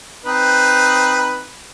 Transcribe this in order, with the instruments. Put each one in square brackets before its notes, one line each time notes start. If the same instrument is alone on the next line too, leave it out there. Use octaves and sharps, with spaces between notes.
[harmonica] C4 D#4 B4